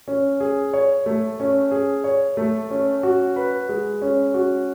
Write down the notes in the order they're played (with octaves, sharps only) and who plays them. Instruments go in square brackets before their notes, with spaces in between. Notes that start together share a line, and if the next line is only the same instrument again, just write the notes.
[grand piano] C#4
G#4
C#5
A3
C#4
G#4
C#5
A3
C#4
F#4
B4
G#3
C#4
F#4